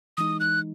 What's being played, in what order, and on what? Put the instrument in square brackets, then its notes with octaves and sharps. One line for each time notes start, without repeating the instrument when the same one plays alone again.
[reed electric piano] E3 G#3 D#4 [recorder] D#6
[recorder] F#6